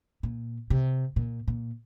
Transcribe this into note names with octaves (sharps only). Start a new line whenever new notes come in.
A#2
C3
A#2
A#2